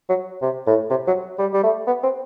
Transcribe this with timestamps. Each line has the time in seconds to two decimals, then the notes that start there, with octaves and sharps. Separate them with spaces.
0.09 F#3
0.42 C3
0.67 A2
0.90 C3
1.07 F#3
1.38 G3
1.53 G3
1.63 A3
1.87 B3
2.03 C4